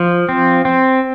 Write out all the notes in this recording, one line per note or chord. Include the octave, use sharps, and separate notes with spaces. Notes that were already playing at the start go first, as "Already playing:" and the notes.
Already playing: F3
C4
C4